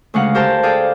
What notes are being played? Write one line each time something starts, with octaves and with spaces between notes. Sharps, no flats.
D2 C#3 G#3 F5 F#5
G4 A#4 C5 A5
G#4 A4 D5 F5 G5